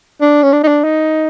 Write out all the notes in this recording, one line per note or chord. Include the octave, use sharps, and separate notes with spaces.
D4
C#4
D4
D#4
D4
D#4